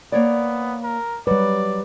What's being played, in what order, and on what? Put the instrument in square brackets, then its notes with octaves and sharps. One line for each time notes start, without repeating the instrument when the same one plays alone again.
[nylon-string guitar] A#3 C#5 D5 [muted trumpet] B3
[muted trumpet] A#4
[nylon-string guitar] F#3 [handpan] G3 B4 [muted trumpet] D5